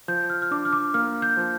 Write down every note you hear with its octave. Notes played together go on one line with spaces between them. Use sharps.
F3 G6
F6
F6
D4 D6
F6
D6
A#3 F6
G6
F3